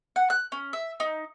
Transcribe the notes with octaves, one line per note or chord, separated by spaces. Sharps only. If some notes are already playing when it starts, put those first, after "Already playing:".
F#5
F#6
C#4
E5
D#4